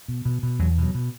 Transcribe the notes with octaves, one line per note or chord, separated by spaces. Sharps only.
B2
B2
B2
E2 F#3
B2
F#3
B2